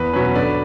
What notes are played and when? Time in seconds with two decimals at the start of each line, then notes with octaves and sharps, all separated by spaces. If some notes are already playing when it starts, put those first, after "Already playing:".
Already playing: E2 B4
0.13 B2 F#3 C#4 B4
0.35 D3 B4 D5